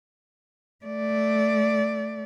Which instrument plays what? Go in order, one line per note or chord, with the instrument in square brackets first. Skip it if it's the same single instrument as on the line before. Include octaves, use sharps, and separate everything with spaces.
[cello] A3 D5